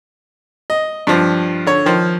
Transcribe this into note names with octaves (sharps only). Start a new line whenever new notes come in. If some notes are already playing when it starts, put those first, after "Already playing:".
D#5
G2 F3
D3 C#5
D#3 F3